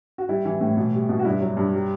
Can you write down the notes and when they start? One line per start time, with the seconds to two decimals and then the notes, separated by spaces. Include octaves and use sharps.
0.18 F#4
0.29 G3 E4
0.45 E3
0.61 A2
0.77 B2
0.93 G3
1.09 B2
1.19 F#4
1.25 G2 E4
1.41 F#3
1.57 G2
1.73 G3